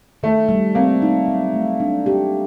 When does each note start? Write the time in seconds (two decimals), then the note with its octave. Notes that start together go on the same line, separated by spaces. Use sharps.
0.23 D#3 A3
0.49 G3
0.75 A#3 C4
1.02 D#4
1.28 F#3
1.54 A3
1.80 D4
2.06 G4